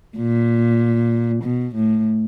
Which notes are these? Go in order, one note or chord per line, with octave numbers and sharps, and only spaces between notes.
A#2
B2
A2